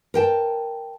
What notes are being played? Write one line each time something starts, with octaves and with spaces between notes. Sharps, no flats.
A#4 G5 A5